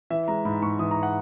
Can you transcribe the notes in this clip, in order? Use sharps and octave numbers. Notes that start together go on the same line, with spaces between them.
E3 E5
G#3 A#5
G#2 B5
G#2 C#6
E3 D#6
A#5
F#5